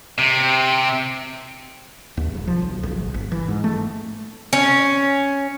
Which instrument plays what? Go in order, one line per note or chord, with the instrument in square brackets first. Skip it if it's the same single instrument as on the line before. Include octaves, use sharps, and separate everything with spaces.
[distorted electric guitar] C3
[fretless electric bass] D#2
E1
F3
B1
B1
G#1
G1
E3
G#2
A3
[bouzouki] C#4